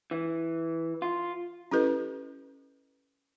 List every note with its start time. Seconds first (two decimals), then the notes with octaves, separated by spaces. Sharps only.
0.11 E3
1.02 F4
1.71 C#4 E4 G4 A4 B4 D#5